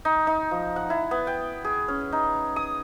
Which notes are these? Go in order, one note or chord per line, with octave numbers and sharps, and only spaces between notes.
D#4
D#4
F3
F#5
E4
B3
G5
G#4
C#4
D#4
D#6